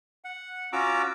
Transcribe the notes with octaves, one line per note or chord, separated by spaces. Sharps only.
F#5
C#4 F4 F#4 A#5 D6 E6